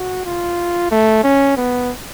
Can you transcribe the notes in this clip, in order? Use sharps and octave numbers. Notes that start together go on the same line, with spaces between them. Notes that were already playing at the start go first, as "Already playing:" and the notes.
Already playing: F#4
F4
A3
C#4
B3